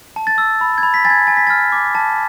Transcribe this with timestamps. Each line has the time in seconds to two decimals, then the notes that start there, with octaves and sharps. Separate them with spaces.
0.16 A5
0.27 A6
0.38 E6
0.61 B5
0.78 G#6
0.83 B5
0.94 B6
1.05 G#5 A6
1.10 G#6
1.27 G#5 A6
1.37 B6
1.47 F6 A6
1.72 D6
1.95 A5